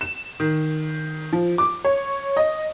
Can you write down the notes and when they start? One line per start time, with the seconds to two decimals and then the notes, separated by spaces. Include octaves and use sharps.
0.01 E7
0.40 D#3
1.32 F3
1.58 D6
1.84 C#5
2.37 D#5